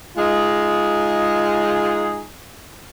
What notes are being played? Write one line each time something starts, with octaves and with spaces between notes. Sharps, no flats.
G#3 D#4 F4 G#4